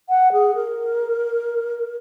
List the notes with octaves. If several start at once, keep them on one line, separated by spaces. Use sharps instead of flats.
F#5
G#4
A#4